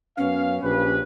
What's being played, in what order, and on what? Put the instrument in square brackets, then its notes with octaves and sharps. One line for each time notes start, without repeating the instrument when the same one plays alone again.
[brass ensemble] F#2 B3 F5 [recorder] C#4
[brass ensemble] A#1 G4 B4